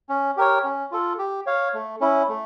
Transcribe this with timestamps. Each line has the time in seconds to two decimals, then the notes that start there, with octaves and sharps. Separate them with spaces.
0.09 C#4
0.37 G4 A#4 C#5
0.64 C#4
0.92 F4 A4
1.19 G4
1.46 C#5 F5
1.74 A3
2.01 C#4 E4
2.29 A3